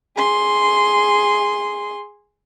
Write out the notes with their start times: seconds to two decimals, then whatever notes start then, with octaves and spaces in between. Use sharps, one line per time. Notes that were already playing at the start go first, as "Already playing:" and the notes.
0.17 G#4 C6